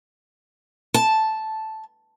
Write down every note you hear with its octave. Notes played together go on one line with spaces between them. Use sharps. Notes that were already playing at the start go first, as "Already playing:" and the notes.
A5